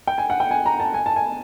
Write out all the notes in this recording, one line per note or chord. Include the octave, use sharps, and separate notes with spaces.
G5
G#5
F#5
G5
G#5
A#5
A5
G#5
A5
G#5